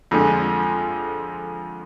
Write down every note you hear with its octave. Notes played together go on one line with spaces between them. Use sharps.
F2 D3 F3 G#3